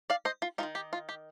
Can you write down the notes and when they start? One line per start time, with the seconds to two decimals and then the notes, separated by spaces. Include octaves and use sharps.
0.10 D5 F5
0.25 C5 D#5
0.42 F4
0.58 G#3 D#4 F4
0.63 D#3
0.75 G4
0.93 F4
1.09 G4